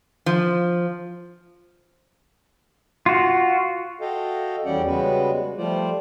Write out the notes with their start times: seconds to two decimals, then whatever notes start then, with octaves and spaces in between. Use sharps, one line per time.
0.26 F3
3.06 F4 F#4
4.01 F#4 A4 D#5 F5 G5
4.65 E2 G3 C#4 D5 F#5 G5
4.86 C#3 G3 G#3 B3 F#4 B4
5.58 F3 G3 A3 F4 C5 D5